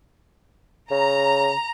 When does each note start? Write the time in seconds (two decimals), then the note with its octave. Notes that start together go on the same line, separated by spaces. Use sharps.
0.91 C#3 A#5